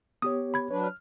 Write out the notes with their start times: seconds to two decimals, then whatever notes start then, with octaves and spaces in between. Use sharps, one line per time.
0.22 B3 G4 C#5 D#6
0.54 B5 G#6
0.71 F#3 D4 B4 C#5
0.84 F6